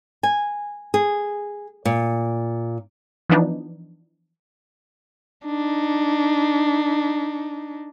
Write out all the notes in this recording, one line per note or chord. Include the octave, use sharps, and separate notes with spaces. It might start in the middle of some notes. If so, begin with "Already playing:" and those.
G#5
G#4
A#2
E3 F3 B3 D4 D#4
D4 D#4